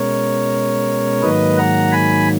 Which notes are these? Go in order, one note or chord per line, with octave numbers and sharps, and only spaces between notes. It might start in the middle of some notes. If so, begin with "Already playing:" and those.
Already playing: B2 G#3 C#4 A#4 C#5
G#2 D#3 F#3 A#3 B4 D#5
F#5 A#5
G#5 B5